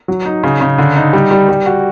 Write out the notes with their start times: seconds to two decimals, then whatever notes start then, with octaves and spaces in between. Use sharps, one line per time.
0.08 F#3
0.25 D#4
0.43 C#3
0.61 C#3
0.78 D3
0.96 D#4
1.13 G3
1.31 G3
1.49 G3
1.66 F#4